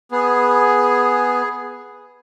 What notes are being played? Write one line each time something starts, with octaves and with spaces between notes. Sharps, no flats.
B3 G#4